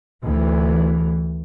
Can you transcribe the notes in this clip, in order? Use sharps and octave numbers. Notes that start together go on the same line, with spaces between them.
D2 E3